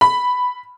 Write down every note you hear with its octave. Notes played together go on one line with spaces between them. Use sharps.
B5